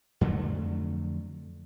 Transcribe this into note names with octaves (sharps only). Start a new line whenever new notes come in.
F2 D3 F#3 A3